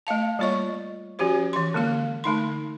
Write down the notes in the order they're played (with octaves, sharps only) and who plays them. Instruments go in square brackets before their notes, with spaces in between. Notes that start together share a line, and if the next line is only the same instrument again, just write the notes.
[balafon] A3 D#5 F5 A5
G3 A#3 F4 C#5 D#5 C#6
F3 C#4 F#4 G4 C5
E3 C6
D3 G#3 A#3 F5
D3 A3 D#4 C6